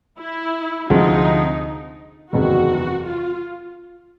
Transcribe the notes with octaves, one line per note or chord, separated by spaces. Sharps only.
E4
D2 C3 F3 G#3 C4 D#4
F#1 E2 C3 D#3 G#3 F#4
F4